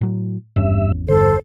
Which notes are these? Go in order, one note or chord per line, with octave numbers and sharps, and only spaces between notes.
A2 F#3
G#1 E2 G2 C#4 E5
G2 D3 A4 C5